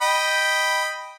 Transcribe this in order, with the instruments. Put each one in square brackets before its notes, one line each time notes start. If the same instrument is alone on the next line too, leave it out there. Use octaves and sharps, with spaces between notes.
[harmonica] D#5 G5 B5